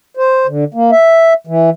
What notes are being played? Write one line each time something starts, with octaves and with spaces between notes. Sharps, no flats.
C5
D3
A#3
E5
E3